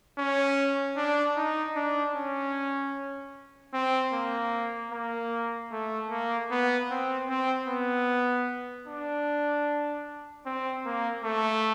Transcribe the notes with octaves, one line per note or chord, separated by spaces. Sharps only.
C#4
D4
D#4
D4
C#4
C4
A#3
A#3
A3
A#3
B3
C4
C4
B3
D4
C4
A#3
A3